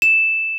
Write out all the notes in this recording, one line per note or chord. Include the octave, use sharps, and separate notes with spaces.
E7